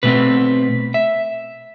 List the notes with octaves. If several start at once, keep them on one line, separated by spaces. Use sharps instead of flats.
B2 A3 C4 B4
E5